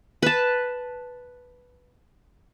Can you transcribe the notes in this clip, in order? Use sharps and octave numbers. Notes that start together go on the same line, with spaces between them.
B4 A5